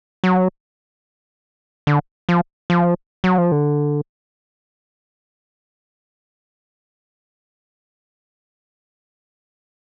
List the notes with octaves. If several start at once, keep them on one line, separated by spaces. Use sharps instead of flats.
F#3
D3
F3
F3
F#3
F3
D3